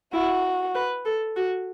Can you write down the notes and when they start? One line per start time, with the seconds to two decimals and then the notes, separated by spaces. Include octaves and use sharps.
0.13 E4 F#4
0.75 B4
1.05 A4
1.36 F#4